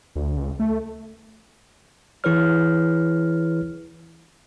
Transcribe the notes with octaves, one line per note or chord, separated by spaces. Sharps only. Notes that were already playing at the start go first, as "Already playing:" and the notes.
D2
C#2
A3
E3 E4 G#4 B4 C#5 F6